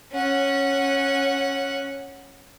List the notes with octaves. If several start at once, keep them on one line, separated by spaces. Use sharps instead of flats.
C#4 F#5